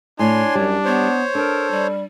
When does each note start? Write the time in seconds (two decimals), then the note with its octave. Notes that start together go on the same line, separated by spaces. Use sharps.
0.19 A2 D4 C#5 G#5 C6
0.55 F#2 G3
0.85 B3 C5 C#5
1.35 D4 A4 A#4
1.70 G3